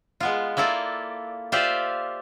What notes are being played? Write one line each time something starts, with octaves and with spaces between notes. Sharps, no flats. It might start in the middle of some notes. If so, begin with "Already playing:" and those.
G#3 B3 F4
A#3 E4 F4 A4 D5
F4 G4 C5 D5 E5 F5